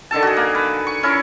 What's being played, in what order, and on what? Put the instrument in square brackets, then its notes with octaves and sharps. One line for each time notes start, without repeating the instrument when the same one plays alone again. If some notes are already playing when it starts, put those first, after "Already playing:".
[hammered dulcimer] D3 D#3 A4 A5
F#4 G#4
A#3
B4
C#6
C#4 E4 A#4